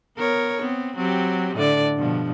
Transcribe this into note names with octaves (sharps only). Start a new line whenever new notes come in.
B3 A#4 C#5
B3 C4
F#3 C4 G4
A2 D3 D5
G2 B2 F3